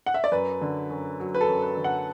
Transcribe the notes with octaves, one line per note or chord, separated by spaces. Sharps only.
F#5
E5
D5
F#2 B4
D3
F#2
F#3
B4
A4
F#2
B4
D3
F#5